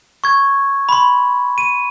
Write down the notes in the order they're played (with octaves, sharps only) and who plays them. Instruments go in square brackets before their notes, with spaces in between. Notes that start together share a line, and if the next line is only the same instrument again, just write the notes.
[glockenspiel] C#6 G#6
B5 C6
D#7